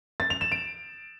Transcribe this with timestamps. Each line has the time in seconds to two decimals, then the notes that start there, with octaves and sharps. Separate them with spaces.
0.20 A6
0.30 F7
0.41 E7
0.52 D7